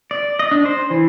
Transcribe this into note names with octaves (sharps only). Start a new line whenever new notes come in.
D5
D#5
D4
C5
E3